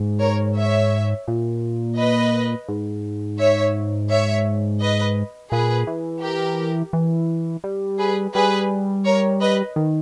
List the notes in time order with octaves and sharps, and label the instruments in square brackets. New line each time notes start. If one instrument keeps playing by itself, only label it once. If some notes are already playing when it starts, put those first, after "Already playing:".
Already playing: [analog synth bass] G#2
[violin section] A#4 C#5
C#5 E5
[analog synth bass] A#2
[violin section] B4 D#5
[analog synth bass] G#2
[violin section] C#5 E5
C#5 E5
B4 D#5
[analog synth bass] A#2 [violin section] G#4 B4
[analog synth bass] E3
[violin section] G4 A#4
[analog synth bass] E3
G3
[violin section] G#4 B4
[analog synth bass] G3 [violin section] G#4 B4
[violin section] A#4 C#5
B4 D#5
[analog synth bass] D#3